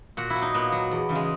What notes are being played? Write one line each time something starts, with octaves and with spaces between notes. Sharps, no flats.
A#2 F#4
E4
F#3
D#4
A#2 B3
F#3
E2
C#3 E3
G#3